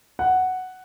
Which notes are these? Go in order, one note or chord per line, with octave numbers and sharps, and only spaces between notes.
F#5